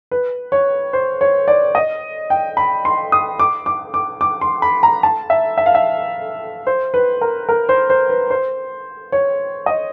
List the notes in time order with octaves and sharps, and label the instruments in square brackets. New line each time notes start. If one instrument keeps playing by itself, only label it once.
[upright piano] B4
C#5
C5
C#5
D5
D#5
G5
B5
C6
D#6
D6
D6
D6
D6
C6
B5
A#5
A5
E5
E5
F5
E5
C5
B4
A#4
A#4
C5
C5
B4
C5
C#5
D#5